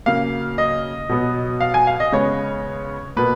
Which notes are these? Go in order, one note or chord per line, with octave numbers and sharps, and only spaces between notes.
C#3 F#3 A#3 F5
D#5
B2 F#3 B3
F5
G#5
F5
D#5
C#3 G#3 B3 C#5
B2 A#3 B4